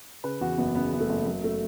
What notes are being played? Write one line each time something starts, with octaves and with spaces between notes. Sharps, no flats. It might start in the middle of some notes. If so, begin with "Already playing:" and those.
C#3 B4
E2 F#4
F#1 B3
C#3 B3
F#1
A3
F#1
F#1 F#3
A3